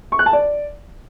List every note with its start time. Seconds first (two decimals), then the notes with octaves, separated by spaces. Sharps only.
0.12 C#6
0.19 F#6
0.26 A5
0.33 D5